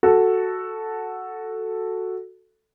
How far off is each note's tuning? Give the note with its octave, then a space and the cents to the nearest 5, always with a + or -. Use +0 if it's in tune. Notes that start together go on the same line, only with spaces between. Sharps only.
F#4 +0 A4 +0